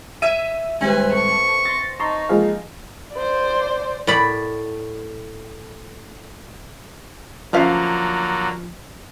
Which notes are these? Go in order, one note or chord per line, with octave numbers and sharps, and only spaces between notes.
E5 E6 G#6 D#7
D#2 G#2 G3 C4 B4 G#5
A4 C#6
C6 A6 A#6
D#4 A5 A#5 C6 C#6
F3 G#3 A#3 G#4 F5
C5 D5
A2 D5 B5
D3 F3 F#3 A3 A#3 C#4 F5